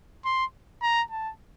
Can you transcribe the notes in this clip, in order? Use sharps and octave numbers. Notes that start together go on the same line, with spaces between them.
C6
A#5
A5